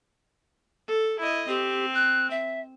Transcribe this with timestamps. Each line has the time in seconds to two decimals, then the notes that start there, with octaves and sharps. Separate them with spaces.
0.88 A4
1.20 E4 D#5
1.48 C4 G4
1.95 F#6
2.30 E5